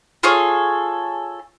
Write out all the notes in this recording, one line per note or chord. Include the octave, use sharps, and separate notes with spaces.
F4 G#4 A4 C#5